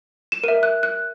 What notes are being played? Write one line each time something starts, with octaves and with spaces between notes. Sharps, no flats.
E7
A#4 E5 D#7
F#6
F#6